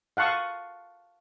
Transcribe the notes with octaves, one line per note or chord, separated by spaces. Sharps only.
F5 F#5 A5 C#6 D#6